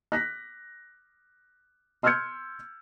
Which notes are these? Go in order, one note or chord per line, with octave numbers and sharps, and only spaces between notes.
F#6 A#6 B6
C6 E6 F6 G6 G#6 C#7